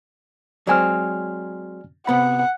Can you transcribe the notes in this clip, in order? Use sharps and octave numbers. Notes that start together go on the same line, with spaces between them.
F#3 G#3 C4 D5 G#5 F6
C3 B3 F#5 B5